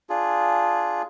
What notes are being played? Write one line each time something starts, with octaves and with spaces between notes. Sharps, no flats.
D4 F4 G#4